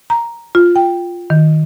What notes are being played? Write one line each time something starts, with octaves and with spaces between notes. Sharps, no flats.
A#5
F4
G5
D#3